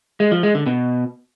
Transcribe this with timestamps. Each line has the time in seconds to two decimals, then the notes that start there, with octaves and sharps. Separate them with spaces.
0.20 G#3
0.32 F3
0.43 G#3
0.55 D3
0.66 B2